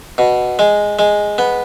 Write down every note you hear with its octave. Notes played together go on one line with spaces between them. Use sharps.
B2
G#3
G#3
B3